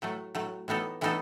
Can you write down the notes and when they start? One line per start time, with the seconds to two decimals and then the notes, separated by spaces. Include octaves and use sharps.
0.02 A2 F#3 A3
0.35 A2 F#3 A3
0.68 A2 E3 B3 D#4 A4
1.01 A2 E3 B3 D#4 A4